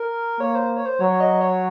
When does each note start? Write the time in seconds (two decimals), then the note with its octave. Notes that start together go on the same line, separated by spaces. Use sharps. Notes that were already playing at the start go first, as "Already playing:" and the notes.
Already playing: A#4
0.40 A#3 C#5
0.55 C5
0.76 C#5
0.85 C5
1.00 F#3 C#5
1.12 C#5
1.20 D#5
1.41 C#5